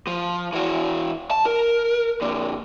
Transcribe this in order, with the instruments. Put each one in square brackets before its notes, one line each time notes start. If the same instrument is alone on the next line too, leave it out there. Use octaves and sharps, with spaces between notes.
[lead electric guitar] F3
E3 F#4
A5
A#4
A#2 D3